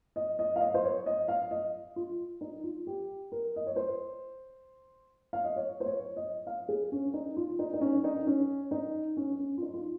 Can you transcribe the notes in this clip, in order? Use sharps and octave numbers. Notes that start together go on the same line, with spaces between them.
D#5
D#5
F5
D#5
C5
C#5
D#5
F5
D#5
F4
D#4
F4
G4
A#4
D#5
C#5
C5
F5
D#5
C#5
C5
C#5
D#5
F5
G#4
C#4
D#4
F4
D#4
D#4
C#4
D#4
C#4
D#4
C#4
C#4
F4
D#4
F4